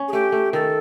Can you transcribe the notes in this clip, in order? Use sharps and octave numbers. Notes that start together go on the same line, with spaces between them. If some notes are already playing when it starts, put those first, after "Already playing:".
Already playing: C#4
G#4
A3 G4
A3
D#3 A4